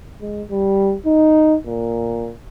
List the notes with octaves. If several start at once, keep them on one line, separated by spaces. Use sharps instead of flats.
G#3
G3
D#4
A#2